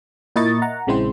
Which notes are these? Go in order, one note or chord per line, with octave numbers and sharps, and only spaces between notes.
A#2 E4 A#4 D#5 C#6 A6
F#5 A#5
A#1 C#3 G#3 C4 E4 C5